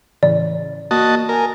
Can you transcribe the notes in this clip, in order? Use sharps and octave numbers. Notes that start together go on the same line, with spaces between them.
A2 C#3 E3 D5
A#3 F#4 D#5 A5
A#4 G#5